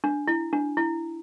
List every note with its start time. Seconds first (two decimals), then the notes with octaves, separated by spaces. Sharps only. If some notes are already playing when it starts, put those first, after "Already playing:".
0.04 D4
0.27 E4
0.53 D4
0.77 E4